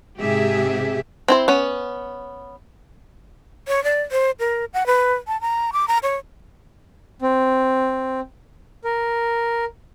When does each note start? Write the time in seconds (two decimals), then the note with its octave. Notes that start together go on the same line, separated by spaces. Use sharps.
0.19 G#2 C3 G4 G#4 E5
1.28 C4 E4 C5
1.48 B3 C#4
3.68 C#5
3.84 D5
4.12 C5
4.39 A#4
4.74 F#5
4.86 B4
5.27 A5
5.41 A#5
5.73 D6
5.88 A#5
6.03 C#5
7.22 C4
8.84 A#4